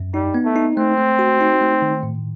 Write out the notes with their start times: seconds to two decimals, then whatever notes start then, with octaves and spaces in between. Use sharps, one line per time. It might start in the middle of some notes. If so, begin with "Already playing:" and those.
Already playing: F#2
0.14 G3 D#4
0.34 B3
0.45 A3
0.56 D#4
0.77 A3 C4
0.98 A3
1.19 F#4
1.40 D#4
1.61 A3
1.82 D#3
2.03 A2